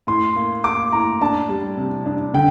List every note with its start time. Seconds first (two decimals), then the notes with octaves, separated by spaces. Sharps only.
0.07 A2 C6
0.36 A#3
0.64 A#3 D6
0.92 A2 A#5
1.21 D4 A5
1.49 G3
1.78 C3
2.06 D4
2.34 D3 G5